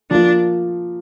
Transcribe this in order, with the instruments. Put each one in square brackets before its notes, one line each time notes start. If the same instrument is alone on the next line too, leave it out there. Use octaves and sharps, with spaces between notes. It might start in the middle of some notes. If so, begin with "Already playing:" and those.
[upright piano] F3 A#3 F4 [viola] D4